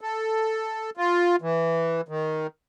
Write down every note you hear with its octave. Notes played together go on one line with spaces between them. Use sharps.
A4
F4
E3
D#3